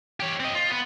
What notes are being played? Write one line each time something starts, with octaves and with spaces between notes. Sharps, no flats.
G4 C#5
C4 D#5
F4
B3